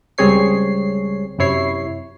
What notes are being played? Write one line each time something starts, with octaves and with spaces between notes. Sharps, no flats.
C#2 G3 C4 G#4 C#5 C7
F#2 C3 E4 C#5 C7